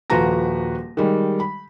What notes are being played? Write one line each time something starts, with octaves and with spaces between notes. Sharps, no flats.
D#1 F3 F#4 B4 A#5 A#6
D#3 G3 G#3
B5